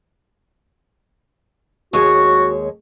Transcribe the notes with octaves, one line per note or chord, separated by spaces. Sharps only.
D#2 G#3 F#4 C#5